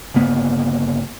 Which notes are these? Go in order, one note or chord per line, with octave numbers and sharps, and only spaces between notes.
G1 C#3 A#3 B3